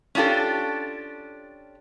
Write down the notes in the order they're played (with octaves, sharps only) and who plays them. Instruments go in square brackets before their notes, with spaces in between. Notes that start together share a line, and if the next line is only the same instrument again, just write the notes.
[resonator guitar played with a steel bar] C#4 D4 F4 G4 A4